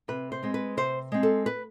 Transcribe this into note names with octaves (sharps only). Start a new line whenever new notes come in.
C3 B4
C5
G#3 C4
B4
C3 C5
G#3 C4
A4
B4